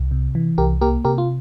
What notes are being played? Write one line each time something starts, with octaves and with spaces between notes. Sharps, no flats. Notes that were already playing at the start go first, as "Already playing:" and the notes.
Already playing: C2
C3
E3
C2 G4 A#4
A#3 G4 A#4
C3 G4 A#4
F4